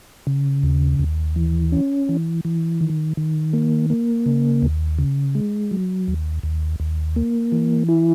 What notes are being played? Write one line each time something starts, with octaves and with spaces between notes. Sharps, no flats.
C#3
D#2
D#2
E3
C#4
E3
E3
D#3
D#3
A#3
A#3
C#3
D#2
C#3
G#3
F#3
D#2
D#2
D#2
A#3
E3
E4